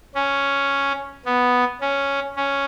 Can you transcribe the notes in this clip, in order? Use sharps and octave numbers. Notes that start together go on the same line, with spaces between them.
C#4
B3
C#4
C#4